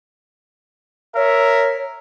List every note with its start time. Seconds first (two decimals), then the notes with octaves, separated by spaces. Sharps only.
1.16 A#4 C#5 E5